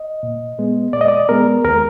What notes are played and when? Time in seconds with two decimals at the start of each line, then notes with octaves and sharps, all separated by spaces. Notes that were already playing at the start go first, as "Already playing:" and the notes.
Already playing: D#5
0.23 A#2
0.59 G#3 B3
0.93 A#2 D5
1.01 D#5
1.08 D5
1.29 G#3 B3 A#4
1.65 D#2 A#4